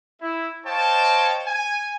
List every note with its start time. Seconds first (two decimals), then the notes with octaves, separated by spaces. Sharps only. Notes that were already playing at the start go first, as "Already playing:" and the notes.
0.21 E4
0.65 C5 C#5 D#5 F5 G5 A5
1.46 G#5